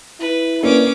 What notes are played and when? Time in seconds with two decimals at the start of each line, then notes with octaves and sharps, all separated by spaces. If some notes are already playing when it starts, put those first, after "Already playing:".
0.20 E4 B4
0.63 A#3 C#4 D4 B4 D6